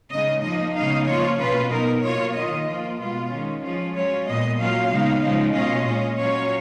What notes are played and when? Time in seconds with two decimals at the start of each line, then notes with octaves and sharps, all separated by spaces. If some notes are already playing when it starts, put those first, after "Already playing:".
0.11 C#3 G#3 D#4 D#5
0.43 F3 A#3 D#4 D#5
0.75 C#3 G#3 B3 D#4 F5
1.07 F3 A#3 F4 C#5
1.40 B2 A#3 C#4 F4 B4
1.71 F#3 B3 D#4 A#4
2.03 B2 A#3 F4 C#5
2.35 D#3 A#3 F4 D#5
2.67 F3 A#3 F4
2.99 B2 G#3 B3 F4
3.30 D#3 G#3 C#4
3.63 F3 G#3 C#4 F4
3.94 F#3 C#4 F4 C#5
4.26 A#2 G#3 B3 D#5
4.58 F#3 C#4 F4 F5
4.90 C#3 G#3 B3 D#4
5.22 C#3 F3 G#3 D#4
5.54 B2 A#3 C#4 F4 D#5
5.85 A#2 G#3 C#4 F4
6.18 F#3 C#4 F4 C#5